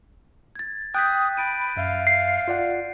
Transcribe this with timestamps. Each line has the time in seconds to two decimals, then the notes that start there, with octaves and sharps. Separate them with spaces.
0.55 G#6 A6
0.95 G5 D#6 F#6 G6 B6
1.37 B5 A6 D7 D#7
1.77 F#2 E5 F5
2.07 C7
2.48 F4 D5 F#5